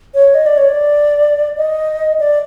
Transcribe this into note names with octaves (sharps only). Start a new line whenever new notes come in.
C#5
D#5
D5
C#5
D5
D#5
D5